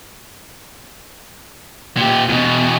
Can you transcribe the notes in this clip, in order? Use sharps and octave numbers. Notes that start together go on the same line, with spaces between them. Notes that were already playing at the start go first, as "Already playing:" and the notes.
A#2 G4
E2 B2